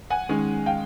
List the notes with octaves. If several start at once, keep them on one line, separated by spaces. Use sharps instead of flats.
F#5 G#5
D#3 G#3 C#4
F5 G5